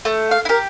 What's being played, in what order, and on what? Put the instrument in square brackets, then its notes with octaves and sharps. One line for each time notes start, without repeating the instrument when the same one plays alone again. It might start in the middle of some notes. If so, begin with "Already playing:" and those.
[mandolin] A3
F5
E4
G4 A#4